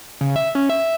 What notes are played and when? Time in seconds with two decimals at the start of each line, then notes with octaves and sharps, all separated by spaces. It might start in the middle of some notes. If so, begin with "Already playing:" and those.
0.21 C#3
0.36 E5
0.55 C#4
0.69 E5